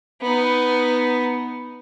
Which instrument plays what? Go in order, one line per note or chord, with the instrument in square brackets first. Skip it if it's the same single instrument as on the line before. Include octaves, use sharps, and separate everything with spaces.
[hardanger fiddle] B3 D#4